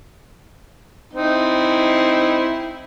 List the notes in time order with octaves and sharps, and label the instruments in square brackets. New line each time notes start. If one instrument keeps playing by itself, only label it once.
[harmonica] C4 D#4 E4